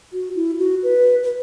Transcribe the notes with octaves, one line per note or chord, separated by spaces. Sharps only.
F#4
E4
F#4
B4
B4